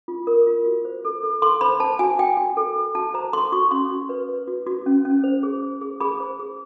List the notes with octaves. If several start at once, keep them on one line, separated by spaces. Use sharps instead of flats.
F4
A#4
F4
F#4
C5
A4
A4
A4 C6
C5 B5
C5 A5
F#4 G#5
F#4 G5
F#4
A4
A4
F#4 A5
C5 A#5
A4 C6
F#4 C#6
C#4 C6
F#4
B4
B4
F#4
F#4
C#4
C#4
C5
G#4
C5
G#4
G#4 B5
C5
G#4